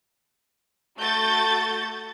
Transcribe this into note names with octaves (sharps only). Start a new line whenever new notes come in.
A3 F#4 G6 A6